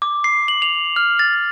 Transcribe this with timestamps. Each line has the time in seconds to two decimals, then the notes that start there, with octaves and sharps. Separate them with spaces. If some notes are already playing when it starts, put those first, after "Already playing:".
0.02 D6
0.24 C7
0.48 F#7
0.62 F7
0.96 F6
1.19 A6